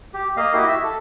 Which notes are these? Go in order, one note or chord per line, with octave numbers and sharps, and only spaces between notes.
G4
A#3 D#5 F5
E4 F#4 G4 D#5
E5
A4